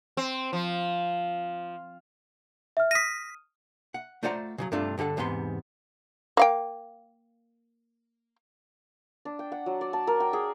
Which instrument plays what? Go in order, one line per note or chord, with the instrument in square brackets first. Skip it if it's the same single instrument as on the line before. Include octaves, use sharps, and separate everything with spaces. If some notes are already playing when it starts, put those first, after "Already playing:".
[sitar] C4
F3
[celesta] E5 F6
[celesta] D#6 F6 D#7 [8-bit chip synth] A#6 B6
[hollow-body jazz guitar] F#5
A3 F4 C5 D5 F#5 A#5
C#3 E3 F#3
G2 C3 A3 D4 F4
G2 D3 G4 A4 F#5
E2 G#2 C3 B3 C6
[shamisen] A#3 F5 G5
[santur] D4
G5
F#5
F#3
D5
A5
A#4
G5
G#4